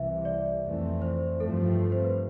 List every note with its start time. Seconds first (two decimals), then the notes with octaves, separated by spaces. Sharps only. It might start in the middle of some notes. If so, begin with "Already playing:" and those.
Already playing: C2 C3 E3 E5
0.25 D5
0.63 F2 E3 A3 C4
1.02 C5
1.40 G2 F3 A3 C4 A4
1.92 C5
2.04 B4